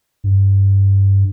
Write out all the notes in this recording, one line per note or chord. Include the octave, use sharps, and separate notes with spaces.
G2